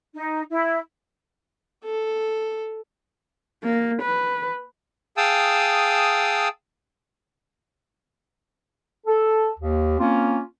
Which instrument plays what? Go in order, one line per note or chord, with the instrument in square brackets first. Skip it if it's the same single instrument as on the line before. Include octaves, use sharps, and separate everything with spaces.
[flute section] D#4
E4
[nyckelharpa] A4
[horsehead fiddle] A#3
B4
[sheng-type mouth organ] G#4 F5 G5 A5 D#6 E6
[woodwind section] A4
D#2
A#3 C4 C#4 F4